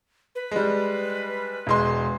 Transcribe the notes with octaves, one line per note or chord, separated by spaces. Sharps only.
B4
G3 G#3
E1 G#3 C6